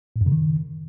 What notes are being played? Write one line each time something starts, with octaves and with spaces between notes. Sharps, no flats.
A2
F#2
C#3
D#3